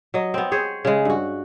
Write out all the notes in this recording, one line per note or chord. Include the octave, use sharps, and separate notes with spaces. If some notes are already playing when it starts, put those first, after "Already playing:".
F#3 D#5
B3 C4
G#4 C5 C#5
C#3 G#3
G2 F#4